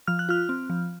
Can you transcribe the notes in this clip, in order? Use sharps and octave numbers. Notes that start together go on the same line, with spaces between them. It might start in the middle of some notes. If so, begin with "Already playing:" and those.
F3 F6
F#6
F4 F6
C4
F3